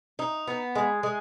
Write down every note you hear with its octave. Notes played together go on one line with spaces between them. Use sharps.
D#4
B3
G#3
G#3